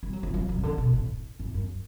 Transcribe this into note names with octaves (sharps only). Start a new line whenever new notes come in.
G3
F#3
F3
F#3
F#3
C#3
D3
B2
A2
G#2
F#2